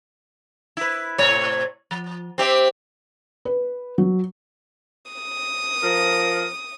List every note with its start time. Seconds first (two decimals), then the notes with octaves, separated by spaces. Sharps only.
0.77 E4 B4
1.18 A2 C3 C#5
1.91 F3
2.38 C4 G4 E5
3.45 B4
3.98 F#3
5.12 D#6
5.83 F3 A#4